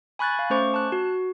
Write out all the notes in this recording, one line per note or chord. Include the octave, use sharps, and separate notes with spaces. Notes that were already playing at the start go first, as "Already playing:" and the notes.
G#5 B5 C#6 F#6 G#6 A6
F5
A3 C#4 C5 C#6 D6
A5 F#6
F#4